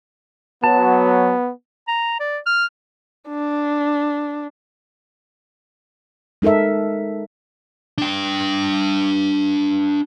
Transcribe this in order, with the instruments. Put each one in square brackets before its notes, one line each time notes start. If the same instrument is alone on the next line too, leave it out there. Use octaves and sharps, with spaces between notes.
[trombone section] F#3 [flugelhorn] B3 [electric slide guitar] A5
[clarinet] A#5
D5
F6
[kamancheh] D4
[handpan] G#3 D#4 A4 A#4 E5
[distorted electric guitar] D4 G5